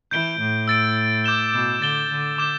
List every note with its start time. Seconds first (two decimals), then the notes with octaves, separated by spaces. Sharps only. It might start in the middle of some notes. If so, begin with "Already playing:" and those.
0.11 E3 G6 D7 G7
0.40 A2
0.68 E6 A6 D7
1.24 D6 G6 E7 G7
1.53 B2
1.81 D3 A6 G7
2.10 D3
2.38 D6 G6 E7 G7